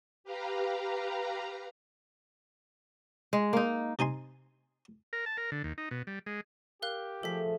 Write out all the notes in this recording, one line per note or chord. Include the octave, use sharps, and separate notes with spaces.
G4 B4 F5 A#5
G#3
A#3 D#4
C3 D#4 G#5 C6
A#4
A5
A#4
D3
D#2
D#4
B2
G3
G#3
G4 A#4 F5 F#6
F3 A3 G#4 A4 E5 B6